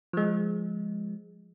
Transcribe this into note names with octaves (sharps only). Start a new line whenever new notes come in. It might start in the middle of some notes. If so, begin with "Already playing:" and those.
F3 G#3